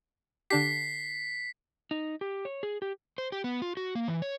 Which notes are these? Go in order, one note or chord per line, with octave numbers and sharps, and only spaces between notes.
D3 D4 G4 B6 C7
D#4
G4
C#5
G#4
G4
C5
G4
B3
F4
F#4
A#3
E3
C#5